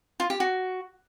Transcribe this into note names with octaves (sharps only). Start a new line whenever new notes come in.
F4
G4
F#4